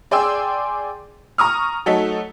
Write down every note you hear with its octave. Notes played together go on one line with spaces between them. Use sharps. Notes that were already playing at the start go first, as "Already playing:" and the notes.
G#4 D5 G5 G#5 C6 E6
A#5 C#6 D#6 F6
F#3 A3 D#4 A4 B6